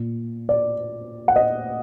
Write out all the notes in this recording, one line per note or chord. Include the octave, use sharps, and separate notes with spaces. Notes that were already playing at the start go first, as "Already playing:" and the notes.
Already playing: A#2
D5
F#5
D#5